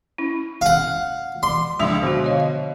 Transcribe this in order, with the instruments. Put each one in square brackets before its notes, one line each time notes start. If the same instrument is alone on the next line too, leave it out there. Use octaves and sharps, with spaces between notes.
[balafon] C#4 E4
[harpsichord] F5 F#5
[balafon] E3 [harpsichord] C6
[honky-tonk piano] C#2 E5 F7 [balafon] F3 D4
[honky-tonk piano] B2 [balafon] D3 F#4
[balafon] C#5 D#5 F5